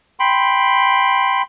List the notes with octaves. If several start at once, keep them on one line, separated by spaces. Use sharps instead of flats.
G5 B5 C6